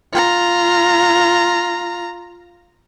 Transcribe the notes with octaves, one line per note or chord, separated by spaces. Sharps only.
F4 A#5